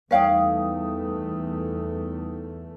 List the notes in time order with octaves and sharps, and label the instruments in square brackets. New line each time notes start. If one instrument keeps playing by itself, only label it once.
[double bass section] E2 A3 [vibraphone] G3 D#4 D#6 [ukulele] C#5 F5 G5